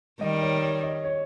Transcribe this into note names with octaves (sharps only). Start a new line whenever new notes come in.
D#3 G3 D#5
C#5
C#5
D#5
C#5